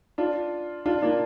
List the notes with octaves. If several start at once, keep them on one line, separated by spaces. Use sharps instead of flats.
D4 F4
D4 F4
A#3 D4